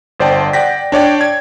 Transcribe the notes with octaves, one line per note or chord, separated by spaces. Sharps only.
G1 C5 D5 G5 A5
D5 F#5 G5 A#6 B6
D4 C#5 D5 G5
G#6